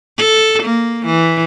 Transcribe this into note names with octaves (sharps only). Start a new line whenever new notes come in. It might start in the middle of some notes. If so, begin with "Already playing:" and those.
A4
A#3
E3